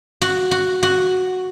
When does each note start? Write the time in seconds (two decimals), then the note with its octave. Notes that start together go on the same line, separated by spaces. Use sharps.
0.22 F#4
0.51 F#4
0.83 F#4